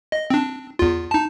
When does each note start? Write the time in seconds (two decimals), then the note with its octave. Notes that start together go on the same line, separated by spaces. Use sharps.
0.12 D#5
0.30 C4 D4
0.79 E2 F4
1.11 D#4 A5